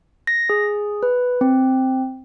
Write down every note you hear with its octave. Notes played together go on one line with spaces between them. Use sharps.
A#6
G#4
B4
C4